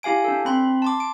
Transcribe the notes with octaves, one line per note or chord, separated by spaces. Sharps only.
E4 G4 F5 G#5 D7
D4 A4
C4 B5 C6
A5 C6 D6
D7